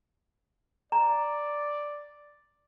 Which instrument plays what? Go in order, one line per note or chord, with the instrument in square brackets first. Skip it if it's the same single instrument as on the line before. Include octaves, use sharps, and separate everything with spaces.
[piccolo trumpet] D5 [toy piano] A#5